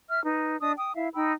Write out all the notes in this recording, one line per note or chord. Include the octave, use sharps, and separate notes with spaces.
E5 F6
D#4 B4
D4 D#5 D#6
G5 D#6
E4 E5 F5
D#4 G5 B5 E6